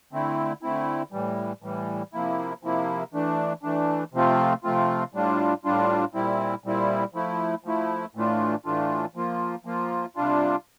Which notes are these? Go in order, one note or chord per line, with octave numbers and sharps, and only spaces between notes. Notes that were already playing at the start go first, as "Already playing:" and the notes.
D3 A3 C4 E4
D3 A3 C4 E4
A2 E3 G3
A2 E3 G3
C3 F3 A#3 E4
C3 F3 A#3 E4
E3 A3 D4
E3 A3 D4
C3 F3 A3 C4 F4
C3 F3 A3 C4 F4
A2 G3 D4 F4
A2 G3 D4 F4
A#2 G3 C4 E4
A#2 G3 C4 E4
F3 A3 E4
F3 A3 E4
A2 E3 A3 D4 F4
A2 E3 A3 D4 F4
F3 A#3 F4
F3 A#3 F4
C3 G3 D4 F4